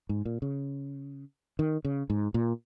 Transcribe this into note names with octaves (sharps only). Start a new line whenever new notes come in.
G#2
A#2
C#3
D#3
C#3
G#2
A#2